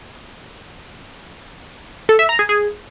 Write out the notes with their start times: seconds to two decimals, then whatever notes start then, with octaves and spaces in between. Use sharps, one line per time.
2.09 A4
2.19 E5
2.29 A#5
2.39 G#4
2.49 G#4